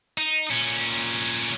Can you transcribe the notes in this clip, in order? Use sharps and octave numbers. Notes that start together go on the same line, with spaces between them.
D#4
A#2 C#4